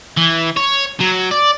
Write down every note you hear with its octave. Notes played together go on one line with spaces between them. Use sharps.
E3
C#5
F#3
D5